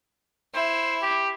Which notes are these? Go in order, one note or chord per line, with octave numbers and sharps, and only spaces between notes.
E4 C5
G4